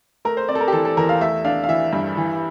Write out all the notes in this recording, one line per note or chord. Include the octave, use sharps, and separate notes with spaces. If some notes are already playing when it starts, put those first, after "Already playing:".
A3 A#4
C5
C4 D5
A4
A#4
G4
E3 A4
A4
E2 A#4
F5
A3 E5
D4 F5
F5
E3 E5
G2
E3